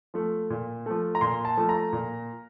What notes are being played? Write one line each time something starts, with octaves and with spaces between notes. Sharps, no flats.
F3 A3
A#2
F3 A3
A#5
A#2 C6
A5
F3 A3
A#5
A#2